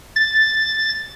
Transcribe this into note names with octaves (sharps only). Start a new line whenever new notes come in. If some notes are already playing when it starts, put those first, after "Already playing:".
A6